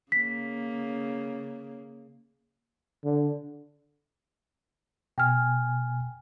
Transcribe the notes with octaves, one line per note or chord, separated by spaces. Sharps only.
C#3 A#3 B6
D3
B2 G5 G#5 F6